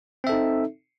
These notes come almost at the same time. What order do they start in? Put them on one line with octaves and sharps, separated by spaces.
C4 E5 A4 D#4